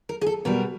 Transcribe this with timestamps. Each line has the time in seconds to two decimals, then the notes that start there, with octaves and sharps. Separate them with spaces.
0.09 A#4
0.21 G#4
0.26 A4
0.45 B2 G3 A#4